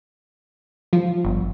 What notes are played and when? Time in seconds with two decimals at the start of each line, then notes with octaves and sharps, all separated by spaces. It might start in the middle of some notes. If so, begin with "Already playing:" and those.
0.93 F3
1.24 G1